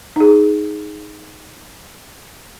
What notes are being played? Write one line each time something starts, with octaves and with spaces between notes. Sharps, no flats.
D#4 G#4